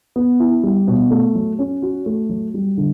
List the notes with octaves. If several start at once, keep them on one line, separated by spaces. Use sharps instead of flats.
B3
E4
G3
B2
A3
F#3
C#4
F#4
A3
F#3
G3
D3